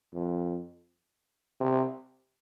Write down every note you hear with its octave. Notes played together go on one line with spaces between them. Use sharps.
F2
C3